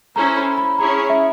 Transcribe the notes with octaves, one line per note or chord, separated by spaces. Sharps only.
C#4 E4 A4 C5 A#5
B5
B5
C#4 E4 G#4 C#5 A#5
E5